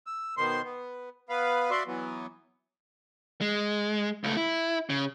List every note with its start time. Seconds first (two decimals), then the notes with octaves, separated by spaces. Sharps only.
0.07 E6
0.37 B2 D#3 C5 C6
0.64 B3
1.29 B3 B4 F5
1.71 F#4 D5 E5 C6
1.87 E3 F#3 B3
3.41 G#3
4.24 C#2 A3
4.37 E4
4.90 C#3